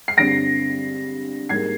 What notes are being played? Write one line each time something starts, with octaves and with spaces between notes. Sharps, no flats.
C7
G2 D3 G3 C4 A#6 D7
G#2 G3 A#3 G#6 C7